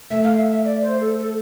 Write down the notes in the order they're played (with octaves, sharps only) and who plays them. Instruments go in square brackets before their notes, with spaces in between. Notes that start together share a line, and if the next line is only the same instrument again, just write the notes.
[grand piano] A3 [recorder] E5
[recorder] F5
E5
E5
D5
C5
A4
A4